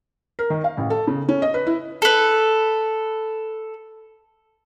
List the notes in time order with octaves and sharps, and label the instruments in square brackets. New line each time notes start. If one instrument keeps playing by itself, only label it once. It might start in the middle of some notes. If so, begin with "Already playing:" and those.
[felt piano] A#4
D#3
F5
A1
A4
C#3
C#4
D#5
B4
E4
[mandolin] A4 B4